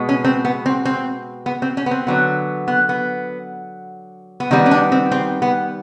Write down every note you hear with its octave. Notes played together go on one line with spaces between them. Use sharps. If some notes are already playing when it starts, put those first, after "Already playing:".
Already playing: B2 G#3 B3
C#4
C4
B3
C4
C4
B3
C4
C#4
B3
C4
D3 F#3 B3
B3
B3
B3
D#3 G3 B3 C4
C#4
D4
C4
C4
B3